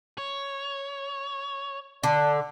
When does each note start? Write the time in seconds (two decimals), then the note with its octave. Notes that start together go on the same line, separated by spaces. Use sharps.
0.18 C#5
2.03 D3 D5 A5